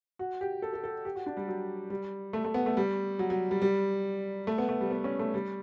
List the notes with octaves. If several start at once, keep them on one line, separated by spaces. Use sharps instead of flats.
F#4
G4
A4
A4
A4
G4
F#4
D4
G3
F#3
G3
A3
A3
B3
A3
G3
F#3
F#3
G3
G3
A3
B3
A3
G3
B3
C#4
A3
G3